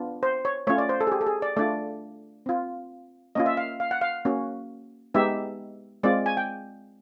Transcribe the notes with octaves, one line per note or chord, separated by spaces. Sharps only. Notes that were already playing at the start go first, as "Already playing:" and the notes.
Already playing: B3 D4 F4
C5
C#5
A3 C#4 F4 C#5
D5
C5
A4
G#4
G4
A4
G#4
D5
A3 D4 F4 D5
C4 F4
A#3 C#4 F4 D#5
E5
F5
F5
F#5
F5
A#3 C#4 F#4
G#3 B3 D#4 G4 E5
G#3 C4 F4 D5
G#5
G5